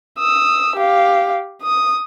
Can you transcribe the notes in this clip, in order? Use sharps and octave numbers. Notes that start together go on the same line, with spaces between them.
D#6 E6
G4 F5
D#6